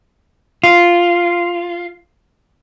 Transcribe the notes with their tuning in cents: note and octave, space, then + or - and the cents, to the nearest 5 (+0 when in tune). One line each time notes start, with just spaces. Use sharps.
F4 -5